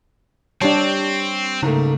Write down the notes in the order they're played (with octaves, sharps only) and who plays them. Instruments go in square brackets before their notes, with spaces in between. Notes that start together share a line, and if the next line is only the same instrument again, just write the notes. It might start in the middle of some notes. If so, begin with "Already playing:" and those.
[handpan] G3 [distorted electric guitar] C4 [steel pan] D4 G4 A5 [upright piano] C#5
[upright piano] G#2 A3 A#3 [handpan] C#3